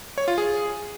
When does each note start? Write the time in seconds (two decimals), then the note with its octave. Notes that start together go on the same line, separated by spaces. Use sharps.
0.18 C#5
0.28 F4
0.38 G#4